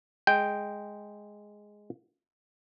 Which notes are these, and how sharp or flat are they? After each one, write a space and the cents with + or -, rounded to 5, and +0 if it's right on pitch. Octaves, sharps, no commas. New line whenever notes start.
G#3 +0 G5 +0